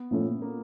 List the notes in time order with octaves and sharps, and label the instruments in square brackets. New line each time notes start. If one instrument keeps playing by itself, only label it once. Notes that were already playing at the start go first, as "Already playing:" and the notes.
Already playing: [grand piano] B3
[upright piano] A#2 F3 A3 C#4
[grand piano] A#3